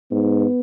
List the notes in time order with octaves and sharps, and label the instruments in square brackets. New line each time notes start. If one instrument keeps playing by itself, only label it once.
[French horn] G#2 [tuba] B3